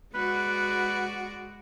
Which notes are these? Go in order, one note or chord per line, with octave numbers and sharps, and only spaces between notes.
G#3 F#4 B4 D5